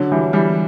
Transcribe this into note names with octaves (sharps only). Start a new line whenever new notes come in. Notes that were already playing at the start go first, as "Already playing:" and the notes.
Already playing: D3 F#3
E3 G3
E3 G3